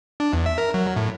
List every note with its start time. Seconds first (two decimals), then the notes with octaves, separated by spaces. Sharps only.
0.20 D4
0.33 E2
0.46 E5
0.58 A#4
0.74 F#3
0.96 A2